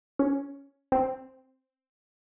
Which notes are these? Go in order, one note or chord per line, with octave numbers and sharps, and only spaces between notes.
C#4
C4